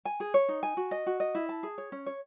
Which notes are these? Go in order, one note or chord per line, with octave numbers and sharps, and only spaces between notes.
G#5
G#4
C#5
D#4
G#5
F#4
D#5
F#4
D#5
E4
A5
G#4
C#5
C#4
C#5